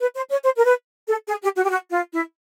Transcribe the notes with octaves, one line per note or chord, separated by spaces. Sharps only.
B4
C5
C#5
C5
A#4
B4
A4
G#4
G4
F#4
G4
F#4
F4
E4